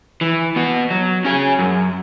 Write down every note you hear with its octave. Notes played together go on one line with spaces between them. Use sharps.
E3
B3 F#4
F#3
C#4 G#4
F#2